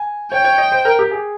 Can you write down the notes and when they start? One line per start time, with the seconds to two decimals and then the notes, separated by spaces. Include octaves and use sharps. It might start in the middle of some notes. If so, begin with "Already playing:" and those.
Already playing: G#5
0.32 C#5 G5
0.45 C#5
0.58 D#5
0.72 C5
0.85 A#4
0.99 G4
1.11 G#4